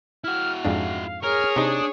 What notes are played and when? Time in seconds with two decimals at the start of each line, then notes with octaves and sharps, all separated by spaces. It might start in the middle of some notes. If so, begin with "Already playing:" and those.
0.24 E4 F#4 F6
0.65 F2 G#2 D4 F5
1.23 G#4 A#4 C#5 F6
1.56 C3 D4 D#4 D#6